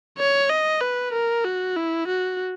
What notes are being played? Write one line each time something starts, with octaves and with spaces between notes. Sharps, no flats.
C#5
D#5
B4
A#4
F#4
E4
F#4